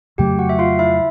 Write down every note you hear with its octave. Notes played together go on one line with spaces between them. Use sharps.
F2 C#3 F#3 A3 G4 G5
F#4 F#5
E5
F4 F5
E4 E5